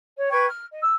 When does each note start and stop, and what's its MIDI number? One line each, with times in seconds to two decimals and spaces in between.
0.16 0.27 73
0.30 0.45 71
0.30 0.45 79
0.30 0.45 85
0.30 0.45 92
0.48 0.64 89
0.69 0.77 75
0.81 0.94 88